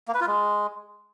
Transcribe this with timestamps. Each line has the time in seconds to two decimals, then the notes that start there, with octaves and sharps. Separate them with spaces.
0.08 A#3
0.14 B4
0.21 F4
0.27 G#3